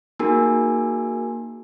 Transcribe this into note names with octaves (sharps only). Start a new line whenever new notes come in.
A#3 D#4 F#4 G#4 A#4 G#5